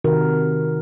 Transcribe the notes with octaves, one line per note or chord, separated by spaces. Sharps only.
C3 D#3 F#4 A#4